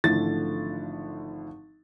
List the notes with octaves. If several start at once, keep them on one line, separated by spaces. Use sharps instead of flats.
G#1 D3 E3 F3 A3 A6